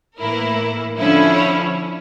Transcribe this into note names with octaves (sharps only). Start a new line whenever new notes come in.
A2 E3 A#3 E4 A#4
D3 F3 C#4 E4
C#5